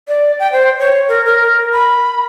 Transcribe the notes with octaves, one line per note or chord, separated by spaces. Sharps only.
D5
G5
C5
C#5
A#4
A#4
B5